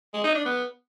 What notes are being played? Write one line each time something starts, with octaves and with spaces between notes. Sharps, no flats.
G#3
D#4
D4
B3